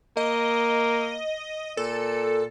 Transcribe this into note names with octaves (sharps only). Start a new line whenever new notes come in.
A#3 D#5
A#2 A4